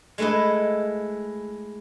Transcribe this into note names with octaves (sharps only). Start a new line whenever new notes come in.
G#3 A3 E4 B4 D#5